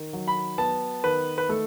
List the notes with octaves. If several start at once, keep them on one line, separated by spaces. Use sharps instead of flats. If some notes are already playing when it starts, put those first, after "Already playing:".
Already playing: D#3
F#3
B5
B3 A5
D#3 B4
B4
A3 A4